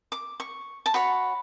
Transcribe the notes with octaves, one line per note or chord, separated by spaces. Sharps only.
D6
C#6
A5
F#4 C#5 B5